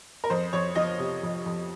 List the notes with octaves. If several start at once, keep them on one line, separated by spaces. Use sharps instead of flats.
A#4
F2 C5
F2 C#5
F3 D#5
C3
F2
F2